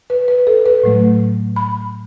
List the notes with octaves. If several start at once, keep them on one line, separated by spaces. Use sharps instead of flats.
B4
B4
A4
B4
A2 F#3 A3
B5